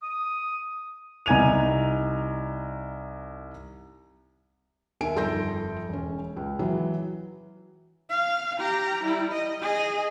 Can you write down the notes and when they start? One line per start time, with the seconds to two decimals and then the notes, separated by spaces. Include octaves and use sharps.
0.02 D#6
1.26 C2 D#4 G#5 G#6 D#7 F7
5.01 D#2 D#3 E5 G#5 D7
5.15 G1 F2 A4 C6 G6 A#6
5.89 E1 C#4
6.37 C#2
6.59 E3 F#3
8.10 F5
8.58 G4 A#5
9.04 G3 E4
9.32 D#5
9.62 G#4 D#5